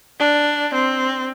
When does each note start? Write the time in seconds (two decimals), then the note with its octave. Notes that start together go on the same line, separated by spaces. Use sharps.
0.20 D4
0.74 C4